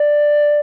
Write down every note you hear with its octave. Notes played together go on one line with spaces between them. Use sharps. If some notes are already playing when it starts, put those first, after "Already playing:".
Already playing: D5